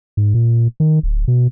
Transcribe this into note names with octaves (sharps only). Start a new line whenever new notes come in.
G#2
A#2
D#3
D1
B2